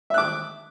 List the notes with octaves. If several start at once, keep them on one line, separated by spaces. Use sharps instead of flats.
E5 D6 F#6